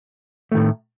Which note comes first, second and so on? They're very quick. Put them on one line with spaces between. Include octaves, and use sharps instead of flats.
A3 D#3 A2